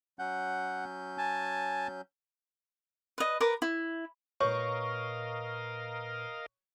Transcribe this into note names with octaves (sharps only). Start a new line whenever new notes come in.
F#3 C#4 F#5 G6
G#5 A5
B4 D#5
A#4 B4 B5 D6
E4
A#2 A#4 B4 C#5 D#5 F5 C#6